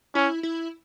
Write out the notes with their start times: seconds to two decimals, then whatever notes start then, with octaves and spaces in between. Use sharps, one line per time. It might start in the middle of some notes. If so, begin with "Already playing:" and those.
0.15 C#4 E4
0.43 E4